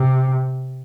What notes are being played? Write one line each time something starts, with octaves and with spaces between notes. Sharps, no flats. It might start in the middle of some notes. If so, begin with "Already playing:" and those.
Already playing: C3